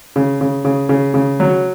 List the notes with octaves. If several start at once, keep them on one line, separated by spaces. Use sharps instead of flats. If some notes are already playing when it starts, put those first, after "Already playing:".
C#3
C#3
C#3
C#3
C#3
F#3